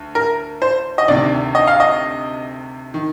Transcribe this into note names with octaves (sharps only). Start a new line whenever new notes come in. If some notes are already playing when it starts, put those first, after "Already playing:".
Already playing: D2
A#4
C5
D#5
D2 C3 D#3 D5
D#5
F5
D#5
D#3